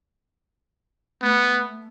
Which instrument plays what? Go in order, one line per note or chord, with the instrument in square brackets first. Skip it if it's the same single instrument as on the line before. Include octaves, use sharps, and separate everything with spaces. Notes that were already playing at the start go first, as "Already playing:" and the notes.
[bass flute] A3 [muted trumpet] B3